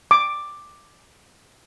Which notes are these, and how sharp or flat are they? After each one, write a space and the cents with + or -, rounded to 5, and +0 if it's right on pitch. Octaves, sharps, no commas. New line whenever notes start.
D6 +5